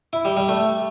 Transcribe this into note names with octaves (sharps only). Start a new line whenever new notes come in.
E4
G3
G3
A3